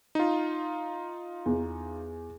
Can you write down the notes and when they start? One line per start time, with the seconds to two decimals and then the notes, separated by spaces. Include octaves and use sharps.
0.15 D#4 F4
1.46 E2